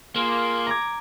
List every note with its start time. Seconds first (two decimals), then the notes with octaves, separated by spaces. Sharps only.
0.16 A#3 F4 G#4 C6
0.67 A#5 D6 G#6